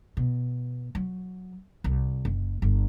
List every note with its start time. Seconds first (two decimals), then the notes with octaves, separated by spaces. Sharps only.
0.17 B2
0.95 F#3
1.84 C2
2.25 F#1
2.62 G1